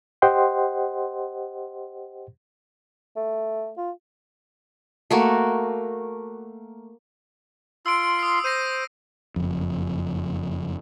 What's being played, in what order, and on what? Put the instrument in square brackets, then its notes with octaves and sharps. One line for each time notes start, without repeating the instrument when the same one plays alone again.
[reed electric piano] G4 C5 D#5 F#5 G5 C6
[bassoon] A3
F4
[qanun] A3 A#3 F#4
[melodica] F4 C6 [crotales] E6 D7
[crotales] D#6 C7
[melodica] C5 [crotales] A#6 C7 D#7
[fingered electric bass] F#1 F2